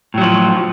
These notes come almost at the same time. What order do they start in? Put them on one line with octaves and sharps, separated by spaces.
A2 F#3 F3